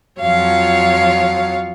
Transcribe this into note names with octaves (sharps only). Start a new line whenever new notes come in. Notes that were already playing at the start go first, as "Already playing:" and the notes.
F2 F3 F#3 C#5 F5